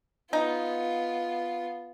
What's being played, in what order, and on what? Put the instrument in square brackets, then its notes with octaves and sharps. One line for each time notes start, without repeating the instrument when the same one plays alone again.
[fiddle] B3 F4 [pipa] D#4